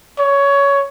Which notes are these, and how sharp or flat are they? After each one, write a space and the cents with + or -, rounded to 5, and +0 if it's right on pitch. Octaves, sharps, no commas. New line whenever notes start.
C#5 +15